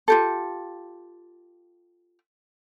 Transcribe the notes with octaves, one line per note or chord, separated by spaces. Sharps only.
F4 G4 A4